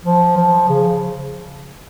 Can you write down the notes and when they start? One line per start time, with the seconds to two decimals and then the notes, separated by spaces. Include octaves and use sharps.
0.05 F3
0.37 F3
0.69 C#3